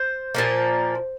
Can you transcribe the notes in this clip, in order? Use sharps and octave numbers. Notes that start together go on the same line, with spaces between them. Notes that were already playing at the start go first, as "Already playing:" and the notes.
Already playing: C5
A#2 F3 A#3